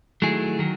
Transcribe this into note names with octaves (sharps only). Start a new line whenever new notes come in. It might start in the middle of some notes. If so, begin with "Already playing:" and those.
D#3 F#3 A3 E4 G#4
D#3 F#3